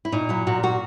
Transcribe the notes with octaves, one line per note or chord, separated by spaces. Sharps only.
E4
A#2 D#4
F#3 E4
A#2 F#4
A#3 F#4